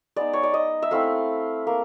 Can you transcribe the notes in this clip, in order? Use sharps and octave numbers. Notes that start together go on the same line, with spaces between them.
G#3 B3 D#4 D5
C#5
D5
D#5
E5
A3 C4 E4 F5
A#3